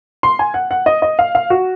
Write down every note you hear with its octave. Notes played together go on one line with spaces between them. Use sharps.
C6
G#5
F#5
F#5
D#5
D#5
F5
F5
F#4